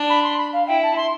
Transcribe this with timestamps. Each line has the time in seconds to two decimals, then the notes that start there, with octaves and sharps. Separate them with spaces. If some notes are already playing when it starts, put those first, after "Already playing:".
Already playing: D4
0.09 B5
0.23 C6
0.38 B5
0.53 F5
0.67 E4 G5
0.83 A5
0.96 C6